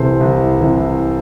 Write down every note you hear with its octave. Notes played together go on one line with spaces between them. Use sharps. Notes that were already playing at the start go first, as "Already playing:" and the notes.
Already playing: C2 C3 E3 A4 C5
C2
C3 E3